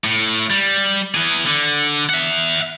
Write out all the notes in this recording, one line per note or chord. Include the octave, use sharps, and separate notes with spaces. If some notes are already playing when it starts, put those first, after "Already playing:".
A2
G3
E3 G#4
D3
E5 F#5